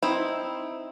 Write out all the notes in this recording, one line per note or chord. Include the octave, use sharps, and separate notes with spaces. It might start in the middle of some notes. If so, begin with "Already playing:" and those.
C4 D#4 E4